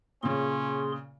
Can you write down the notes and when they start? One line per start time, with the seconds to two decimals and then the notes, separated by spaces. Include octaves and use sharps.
0.23 A#2 C#3 C#4 G#4 C6